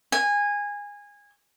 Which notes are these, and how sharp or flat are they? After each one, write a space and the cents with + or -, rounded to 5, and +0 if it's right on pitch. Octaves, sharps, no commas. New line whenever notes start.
G#5 -20